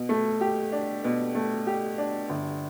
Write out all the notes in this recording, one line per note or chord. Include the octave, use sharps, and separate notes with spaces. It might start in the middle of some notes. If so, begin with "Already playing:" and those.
Already playing: B2
A3
G4
D4
B2
A3
G4
D4
G1